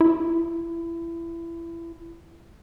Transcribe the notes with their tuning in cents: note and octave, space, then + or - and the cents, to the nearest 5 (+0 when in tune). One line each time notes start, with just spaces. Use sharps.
E4 +25